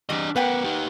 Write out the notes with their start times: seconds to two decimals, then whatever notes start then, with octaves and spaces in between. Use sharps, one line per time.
0.09 E2 G3 D4 D#5
0.36 B3 A#4 B4 F#5 G5
0.64 D#4 G4